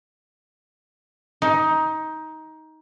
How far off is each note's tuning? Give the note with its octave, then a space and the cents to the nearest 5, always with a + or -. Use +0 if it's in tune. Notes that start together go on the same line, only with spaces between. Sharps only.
D#4 +15